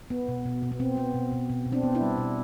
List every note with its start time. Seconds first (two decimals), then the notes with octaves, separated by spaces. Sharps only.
0.10 B3
0.28 B2
0.46 B2
0.63 B2
0.72 B3
0.80 B2 C4
0.97 B3
1.14 B2
1.32 B2
1.50 B2
1.66 B2
1.72 C4 D4
1.83 B3
1.95 D4 E4
2.01 G3
2.18 B2